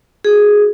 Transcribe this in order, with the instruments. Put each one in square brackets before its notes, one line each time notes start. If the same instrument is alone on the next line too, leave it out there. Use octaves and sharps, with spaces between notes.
[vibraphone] F#4 G#4